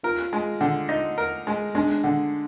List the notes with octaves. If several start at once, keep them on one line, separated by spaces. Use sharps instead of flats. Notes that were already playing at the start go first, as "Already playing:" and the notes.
F4 A#4
G#3
D3
D#4
A#4
G#3
G#3 D4
D3